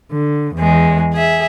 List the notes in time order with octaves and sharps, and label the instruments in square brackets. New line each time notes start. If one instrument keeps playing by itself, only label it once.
[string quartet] D3
E2 G#3
G#4 E5